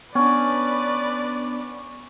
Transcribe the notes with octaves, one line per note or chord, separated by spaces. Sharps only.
B3 C#4 D4 B4 D5